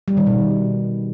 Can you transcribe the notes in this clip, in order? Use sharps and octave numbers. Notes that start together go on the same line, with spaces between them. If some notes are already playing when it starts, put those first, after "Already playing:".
G3
D#3
B2